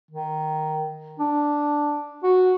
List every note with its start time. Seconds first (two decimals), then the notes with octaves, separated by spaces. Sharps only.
0.11 D#3
1.20 D4
2.24 F#4